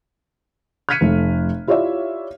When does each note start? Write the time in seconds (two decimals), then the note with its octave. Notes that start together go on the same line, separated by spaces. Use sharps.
0.89 F6 F#6 G#6 B6 C#7 D#7
1.01 F1 A3
1.67 E4 F4 G4 C#5 D5 E5